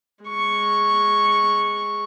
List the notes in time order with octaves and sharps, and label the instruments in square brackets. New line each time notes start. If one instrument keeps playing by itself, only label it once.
[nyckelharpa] G#3 C#6